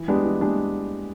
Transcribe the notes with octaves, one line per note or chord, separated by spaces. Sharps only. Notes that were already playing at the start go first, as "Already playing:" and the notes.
Already playing: E3
G#3 B3 D4 G4
E3
G#3 B3 D4 G4